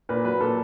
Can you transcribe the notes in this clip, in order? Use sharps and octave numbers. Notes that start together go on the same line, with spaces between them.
A#2 B4
F#3 B4
A#2 A4